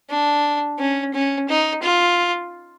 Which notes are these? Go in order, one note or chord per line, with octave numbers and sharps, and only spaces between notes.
D4
C#4
C#4
D#4
F4